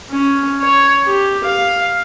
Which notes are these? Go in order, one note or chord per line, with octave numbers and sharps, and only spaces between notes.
C#4
C#5
G4
F5